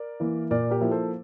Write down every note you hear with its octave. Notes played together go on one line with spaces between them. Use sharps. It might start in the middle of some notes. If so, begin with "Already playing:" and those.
Already playing: A#4 D5
E3 A#3 E4
A#2 A#4 D5
G4 A#4
F3 A#3 E4
A4 C5